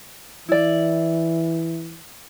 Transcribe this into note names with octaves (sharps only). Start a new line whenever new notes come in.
E3 E4 D5